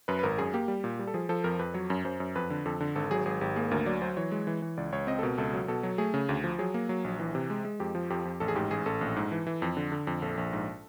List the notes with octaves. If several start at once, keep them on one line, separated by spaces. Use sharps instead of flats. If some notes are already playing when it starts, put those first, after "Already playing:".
F#2 B4
B4
G#1 A#4
F#2 G#4
A#3 G4
G3
A#2
G3
A4
F3 G#4
F3 A4
F2 A#4
F2 B4
F#3 C#5
F#2
F#2 C5
F#2
F2 B4
D3
F2 A4
D3
G#1 A4
F#3 G#4
G#1 G#4
G#1 G4
A#3 G#4
D2 A#4
F#3 D5
F#3 C5
E3 C#5
G#3
E3
E3
C#2 D5
C#2 C#5
C4 D#5
A4
B2 A#4
C#2 A4
F#3
B2 A4
F#3
A3 G#4
C#3
D2
F3
F#3 G#4
A#3
F#3
A#1
E3
C3
G#3
G#3
F2 G4
F3
F2 G4
F2
A1 A4
G#4
G#2 G4
A1 G#4
A1 A4
A#1
G#2
E3
E3
F2
D3
D3
F2
A#1 A4
A#1
G#2